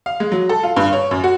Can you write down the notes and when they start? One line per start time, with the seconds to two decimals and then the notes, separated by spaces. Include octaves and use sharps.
0.06 F5
0.20 G#3
0.32 F#3
0.49 A4
0.63 F4
0.77 G2
0.93 C#5
1.11 F#2
1.24 F#4